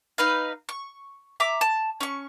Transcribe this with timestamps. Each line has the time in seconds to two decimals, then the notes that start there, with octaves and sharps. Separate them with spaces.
0.18 D#4 B4 F5
0.69 C#6
1.40 E5 A#5 D6
1.61 A5
2.01 C#4 C#6